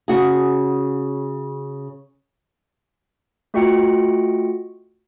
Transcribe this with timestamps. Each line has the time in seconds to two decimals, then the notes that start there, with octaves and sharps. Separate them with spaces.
0.08 C#3 F#4 G#4
3.54 A3 F4 F#4 D#5 G5 C#7